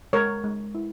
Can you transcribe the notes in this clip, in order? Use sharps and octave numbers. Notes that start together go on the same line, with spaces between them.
G#3 A#4 C#5
G#3
E4